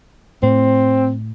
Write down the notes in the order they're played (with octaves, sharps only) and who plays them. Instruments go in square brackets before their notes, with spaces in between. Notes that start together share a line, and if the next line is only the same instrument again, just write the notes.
[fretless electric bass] A2 [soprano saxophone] C4